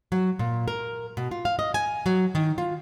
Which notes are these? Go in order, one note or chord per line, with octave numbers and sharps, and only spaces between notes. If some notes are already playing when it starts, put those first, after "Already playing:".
F#3
A#2
A#4
B2
F4
F5
D#5
G#5
F#3
D#3
F4